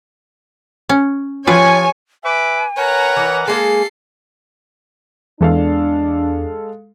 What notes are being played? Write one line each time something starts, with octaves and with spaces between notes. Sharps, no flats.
C#4
F3 F4 G4 B4 C#5 G#5
B4 E5 G#5 D6
A#4 B4 C#5 F#5 A#5
E3 D#4
G#3 A#3 G#4 A4 C7
E2 G#3 D4 A4 F5